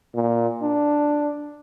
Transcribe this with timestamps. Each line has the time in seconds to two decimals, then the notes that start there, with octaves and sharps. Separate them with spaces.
0.14 A#2
0.61 D4